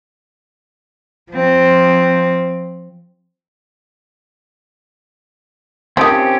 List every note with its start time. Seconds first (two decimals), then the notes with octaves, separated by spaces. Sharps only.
1.32 F3 C4
5.97 D#3 F3 C4 C#4 G4